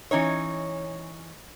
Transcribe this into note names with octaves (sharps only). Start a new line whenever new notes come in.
E3 C#4 D#4 C#5